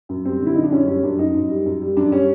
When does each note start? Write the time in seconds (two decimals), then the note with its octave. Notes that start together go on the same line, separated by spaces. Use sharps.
0.09 F#2
0.25 G3 C4
0.40 D3
0.46 E4
0.55 F#2 D#4
0.64 D4
0.72 F#2 C#4
0.88 G3 C#4
1.03 F#2 D4
1.19 F#2 D#4
1.34 F#2
1.50 G3
1.66 F#2
1.82 G3
1.97 F#2 D4
2.12 G3 C#4